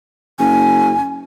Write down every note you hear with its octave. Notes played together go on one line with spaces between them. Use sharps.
F#1 G#5